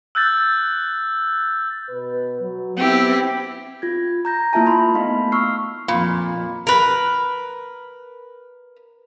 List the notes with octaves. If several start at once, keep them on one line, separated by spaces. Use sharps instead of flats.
E6 F#6 G6 A6
B2 B4
F#3
B3 C4 E4 G4
F4 G#6
A#5 G6 A#6
A#3 E4 F4 E5 G#5 A5
G#5 A5 B5 C6
A3 B3 D#4 F5
C#6 E6 F6 C7
F2 A#2 F5 B5
A#4 B4